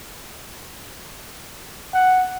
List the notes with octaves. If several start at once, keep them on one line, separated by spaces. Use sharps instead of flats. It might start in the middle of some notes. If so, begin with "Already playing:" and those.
F#5